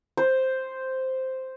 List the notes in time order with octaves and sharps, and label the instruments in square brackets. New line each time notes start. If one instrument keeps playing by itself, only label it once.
[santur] C5